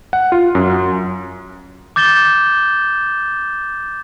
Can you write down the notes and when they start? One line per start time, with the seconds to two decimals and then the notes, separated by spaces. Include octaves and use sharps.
0.13 F#5
0.32 F4
0.55 F#2
1.96 D6 G6 A6 E7 G7